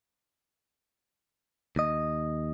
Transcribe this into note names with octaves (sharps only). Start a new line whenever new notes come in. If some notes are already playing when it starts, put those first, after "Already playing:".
D#2 D#5